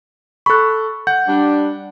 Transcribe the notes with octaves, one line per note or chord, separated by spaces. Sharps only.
A4 B5 C#6 F#6
F#5 G6
G3 D4